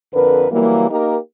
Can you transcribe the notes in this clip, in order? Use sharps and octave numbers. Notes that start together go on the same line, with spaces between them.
F2 D3 A#4 B4
E3 F#3 G3 A#3
A#3 D#4 G4 A#4